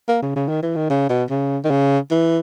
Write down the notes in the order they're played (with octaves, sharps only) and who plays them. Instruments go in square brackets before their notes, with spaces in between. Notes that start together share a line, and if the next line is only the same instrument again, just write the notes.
[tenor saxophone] A#3
C#3
C#3
D#3
E3
D#3
C#3
B2
C#3
D#3
C#3
E3